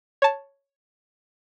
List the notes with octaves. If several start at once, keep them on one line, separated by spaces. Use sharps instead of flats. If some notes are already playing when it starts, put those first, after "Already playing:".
C#5 A5